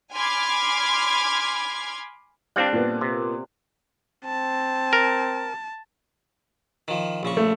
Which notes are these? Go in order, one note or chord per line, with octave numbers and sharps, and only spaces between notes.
G#5 B5 C6 D6 F6 G#6
G3 C4 D4 F5 G5 F#6
A#2 A#3 B3
C3
C4 A5
A#4
D#3 F3
A#1 C#3 C#6
A3